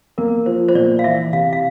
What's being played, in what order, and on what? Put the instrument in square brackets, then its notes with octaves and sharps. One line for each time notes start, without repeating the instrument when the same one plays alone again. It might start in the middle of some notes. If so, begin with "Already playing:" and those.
[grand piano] A#3 [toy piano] A#4
[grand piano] F3 [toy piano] C5
[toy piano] C5
[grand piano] A#2 [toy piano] D5
[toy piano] F5
[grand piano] E3 [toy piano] E5
[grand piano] C3 [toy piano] F5
[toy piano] F5